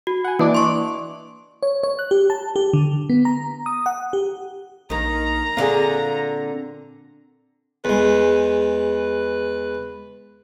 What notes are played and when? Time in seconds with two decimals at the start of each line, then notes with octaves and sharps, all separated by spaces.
0.07 F#4
0.24 F#5 G#5
0.39 E3 A#3 D4 D6
0.55 C6 C#6
1.63 C#5
1.83 C#5
1.99 F#6
2.11 G4
2.30 A5
2.56 G4
2.73 D3
3.10 B3
3.25 A#5
3.66 D#6
3.86 F#5
4.13 G4
4.90 A#1 D#3 A#3 A#5
5.57 A#2 D3 C4 G#4 D5 F5
7.85 E2 G#3 B4